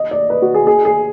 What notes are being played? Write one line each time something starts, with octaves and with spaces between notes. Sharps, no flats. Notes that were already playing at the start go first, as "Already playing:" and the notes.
Already playing: D#5
D5
B4
F#4
G#4
G#4
G#4